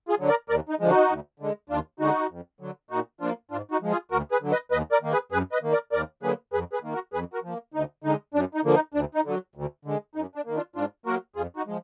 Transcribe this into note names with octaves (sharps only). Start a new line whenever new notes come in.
F4 G#4
D3 F#3
A#4 D5
D#2 A#4 D5
D#4
D3 F3 G#3
D#4 F#4
D2
D3 G#3
D#2 D4 F4
D3 G#3 D#4 F#4
F2
D3 F#3
A#2 D#4 F#4
F3 A#3 D4 F4
G#2 D4 F4
D#4 F#4
F3 G#3
F4 G#4
D2 F#4 A#4
G#4 B4
D3 F#3
B4 D#5
D#2 B4 D#5
A#4 D5
D#3 A#3
G#4 B4
F#2 G#4 B4
B4 D#5
D#3 A#3
A#4 D5
D#2 A#4 D5
D3 F#3 A#3 G#4 B4
F2 G#4 B4
G#4 B4
D#3 A#3
F#4 A#4
F2 G#4 B4
F#4 A#4
F3 A#3
D2 D#4
D3 G#3 D#4
F#2 D4
D#4
D3 F3 A#3
D#4
D2 D4
D#4
D3 F#3
D2
D3 G#3
F#2 D#4
D4
D#3 A#3
D4 F4
G#2 D4 F4
F#3 A#3 F#4 A#4
F2 F4 G#4
D#4 F#4
F3 G#3